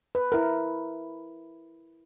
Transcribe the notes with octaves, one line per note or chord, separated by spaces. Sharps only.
B4
E4 A#4